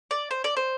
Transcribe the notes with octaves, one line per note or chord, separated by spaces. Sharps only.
D5
C5
D5
C5